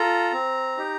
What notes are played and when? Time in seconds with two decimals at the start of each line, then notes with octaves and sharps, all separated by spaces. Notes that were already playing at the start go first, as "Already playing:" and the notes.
Already playing: F4 A4 A#5
0.33 C4
0.77 D#4 G4